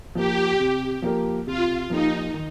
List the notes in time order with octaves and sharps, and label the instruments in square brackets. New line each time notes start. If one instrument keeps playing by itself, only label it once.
[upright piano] F3 A#3 [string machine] G4
[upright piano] C3
F3 A#3 G4 A#4
[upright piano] C3 [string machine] F4
[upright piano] F3 A#3 G4 A#4 [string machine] D#4
[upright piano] D#3